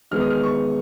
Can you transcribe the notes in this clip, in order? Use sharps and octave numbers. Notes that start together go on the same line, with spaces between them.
D#3 G#3 B3 D#4 F6
D#6
F6
C#6